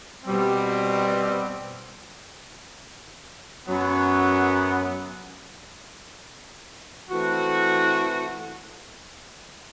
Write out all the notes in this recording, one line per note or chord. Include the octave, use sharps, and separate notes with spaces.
B2 G3 C4
F#2 F#3 B3
E3 A3 C4 F#4